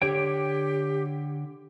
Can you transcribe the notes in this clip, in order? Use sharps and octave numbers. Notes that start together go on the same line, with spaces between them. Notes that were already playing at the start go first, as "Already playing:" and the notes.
D3 G4 C#5 G5